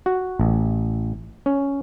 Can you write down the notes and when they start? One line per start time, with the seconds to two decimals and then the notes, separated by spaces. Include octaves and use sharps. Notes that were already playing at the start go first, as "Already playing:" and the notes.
0.06 F#4
0.40 A1
1.46 C#4